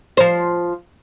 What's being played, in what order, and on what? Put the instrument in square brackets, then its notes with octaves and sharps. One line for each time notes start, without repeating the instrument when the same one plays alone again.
[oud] F3 C5